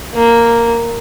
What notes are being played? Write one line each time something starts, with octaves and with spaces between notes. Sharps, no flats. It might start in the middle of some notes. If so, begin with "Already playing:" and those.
A#3